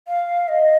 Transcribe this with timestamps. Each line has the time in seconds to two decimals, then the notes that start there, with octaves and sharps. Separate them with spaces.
0.08 F5
0.48 D#5